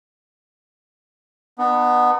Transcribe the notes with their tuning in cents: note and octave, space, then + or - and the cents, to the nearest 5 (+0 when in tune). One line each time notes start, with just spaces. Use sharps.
B3 +0 D4 +45